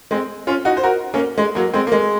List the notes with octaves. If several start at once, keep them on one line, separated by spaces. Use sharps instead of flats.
G#3 C4
C#4 F4
D#4 F#4
C5
F#4 A#4
A#3 C#4
G#3
F#3 A#3
G#3 C4
A#3
G#3